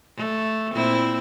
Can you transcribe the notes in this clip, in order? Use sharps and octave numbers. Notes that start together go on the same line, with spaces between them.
A3
A#2 C4 E4